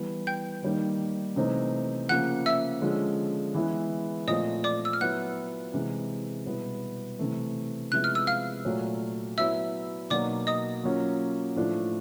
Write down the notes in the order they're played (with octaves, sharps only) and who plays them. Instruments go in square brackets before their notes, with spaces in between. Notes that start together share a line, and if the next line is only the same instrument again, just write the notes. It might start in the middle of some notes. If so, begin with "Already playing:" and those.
Already playing: [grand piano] E3 G3 B3
[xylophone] G5 G6
[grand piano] D#3 G3 A#3 D#4
C3 E3 A3 C4 D#4
[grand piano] C#3 F3 A#3 [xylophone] F#5 F#6
[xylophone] E5 E6
[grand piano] D3 F3 G#3 C#4
E3 G#3 B3 E4
[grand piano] A#2 F3 A3 C4 F4 [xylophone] D#5 D#6
[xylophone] D5 D6
E6
F6
[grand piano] F#3 B3 E4 [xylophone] F#5 F#6
[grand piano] C3 E3 G#3
B2 G3 B3 E4
C3 E3 A3
[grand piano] C3 F3 G#3 B3 E4 [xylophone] F#6
[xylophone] F6
E6
F5 F6
[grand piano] A#2 F#3 A3
[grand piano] F#3 B3 E4 [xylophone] E5 E6
[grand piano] B2 F#3 A#3 D#4 [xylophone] D5 D6
[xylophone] D#5 D#6
[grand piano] F#3 A#3 C#4 F4
A2 F3 A3 D4 F4